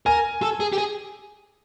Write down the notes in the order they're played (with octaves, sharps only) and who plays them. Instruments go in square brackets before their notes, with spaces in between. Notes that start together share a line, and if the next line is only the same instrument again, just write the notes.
[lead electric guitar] A#4 [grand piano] G#5
[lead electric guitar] A4
G#4
G4
G#4